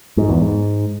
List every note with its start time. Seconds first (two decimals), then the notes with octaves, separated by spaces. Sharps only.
0.17 G#2
0.29 E2
0.41 G#2